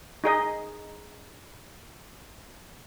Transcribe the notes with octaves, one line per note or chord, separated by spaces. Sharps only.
D#4 G#4 D#5